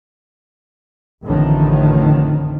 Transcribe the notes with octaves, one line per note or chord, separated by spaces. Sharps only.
A1 F2 A2 D3 D#3